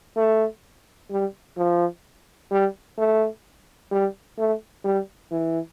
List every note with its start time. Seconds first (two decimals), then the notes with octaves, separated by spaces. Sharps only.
0.16 A3
1.10 G3
1.57 F3
2.51 G3
2.98 A3
3.91 G3
4.39 A3
4.85 G3
5.31 E3